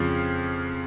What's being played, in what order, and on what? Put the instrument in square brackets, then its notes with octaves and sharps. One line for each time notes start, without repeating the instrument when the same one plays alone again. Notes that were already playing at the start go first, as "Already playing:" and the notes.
Already playing: [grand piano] F2 C#3 F3